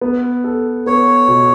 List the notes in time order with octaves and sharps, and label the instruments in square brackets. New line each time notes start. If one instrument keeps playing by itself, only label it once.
[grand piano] B3
A4
[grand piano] B3 [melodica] C#5
[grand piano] B2